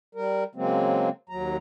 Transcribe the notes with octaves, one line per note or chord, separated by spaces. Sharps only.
G3 A#4
C#3 F#3 G#3 A#3 C4
D#2 F#3 A#5